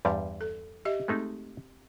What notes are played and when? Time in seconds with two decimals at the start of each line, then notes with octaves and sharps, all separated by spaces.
0.05 E2 G2 G3 C6
0.41 A4
0.85 G4 D#5 E5
1.08 G#3 A3 C4 D#4